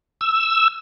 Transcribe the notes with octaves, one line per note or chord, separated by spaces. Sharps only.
E6